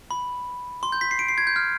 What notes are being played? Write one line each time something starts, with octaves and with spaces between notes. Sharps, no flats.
B5
C6
G6
B6
C7
D7
C7
G#6
G6
F6